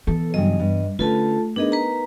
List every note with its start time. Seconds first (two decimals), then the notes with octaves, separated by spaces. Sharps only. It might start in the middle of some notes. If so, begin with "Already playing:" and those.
0.07 E3 B3 A4
0.34 G2 C#3 F#3 D#5
0.60 G2
0.99 D3 A3 C#4 F4 A4 B4 A5
1.56 B3 D4 D#4 G#4 A#4 D#5
1.72 B4 A#5